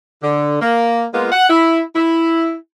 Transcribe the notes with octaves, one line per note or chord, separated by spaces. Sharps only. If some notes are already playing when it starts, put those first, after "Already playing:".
D3
A#3
G#3 A#3 B3 F4
F#5
E4
E4